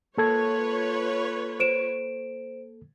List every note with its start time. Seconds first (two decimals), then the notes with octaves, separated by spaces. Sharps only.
0.18 A#3 F4 A4 B4 C#5 G#6
1.60 C5 D7 E7